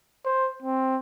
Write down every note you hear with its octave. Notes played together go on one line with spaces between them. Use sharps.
C5
C4